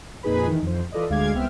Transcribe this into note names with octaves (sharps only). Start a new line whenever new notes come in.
F2 A#2 D#4 G#4 B4 B5
D#3 E3
F2 C5
E3 F4 A4 B4 D5 D#5
D2 G#3 F5 D6 G#6
C2 B3 C4 E5 G5 F6